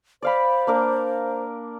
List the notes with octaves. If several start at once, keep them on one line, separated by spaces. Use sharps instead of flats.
C5 D5 F5 B5
A#3 D4 A#4